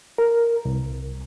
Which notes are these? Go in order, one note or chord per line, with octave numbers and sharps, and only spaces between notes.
A#4
C2